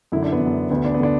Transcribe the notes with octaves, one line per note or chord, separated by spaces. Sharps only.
F#2 D3 E4
D4
B3
F#2 D3
D2 D3 B3
D4
B3
D3 D4